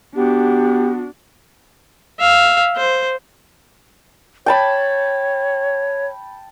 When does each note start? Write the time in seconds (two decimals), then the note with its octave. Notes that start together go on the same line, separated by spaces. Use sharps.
0.16 B3 D4 F#4 G4
2.20 E5 F5
2.76 C5
4.46 C#5 G5 A5 B5